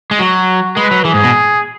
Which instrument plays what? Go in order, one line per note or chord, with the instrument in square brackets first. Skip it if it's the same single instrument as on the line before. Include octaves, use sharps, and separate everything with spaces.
[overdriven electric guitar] G#3
[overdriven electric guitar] F#3 [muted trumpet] F#4
[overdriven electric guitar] G#3 [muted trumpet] B4
[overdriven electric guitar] F#3
[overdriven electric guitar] E3 [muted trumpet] G#4
[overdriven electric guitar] G#2
B2